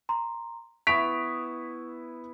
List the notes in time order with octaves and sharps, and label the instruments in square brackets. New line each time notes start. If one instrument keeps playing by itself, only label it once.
[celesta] A#5 C6
[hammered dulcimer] B3 E4 [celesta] C#6 [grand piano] B6 D7 F7